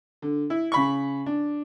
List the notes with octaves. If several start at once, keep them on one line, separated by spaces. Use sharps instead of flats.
D3
E4
C#3 B5 C#6
D4